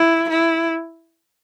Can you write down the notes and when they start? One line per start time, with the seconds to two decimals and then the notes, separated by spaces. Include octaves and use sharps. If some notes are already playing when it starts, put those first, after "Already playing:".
Already playing: E4
0.30 E4